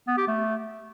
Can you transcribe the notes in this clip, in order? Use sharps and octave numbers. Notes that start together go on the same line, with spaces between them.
B3
G4
A3